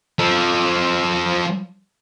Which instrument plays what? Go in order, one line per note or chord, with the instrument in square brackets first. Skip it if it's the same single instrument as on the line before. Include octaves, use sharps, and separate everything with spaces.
[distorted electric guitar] F3 A4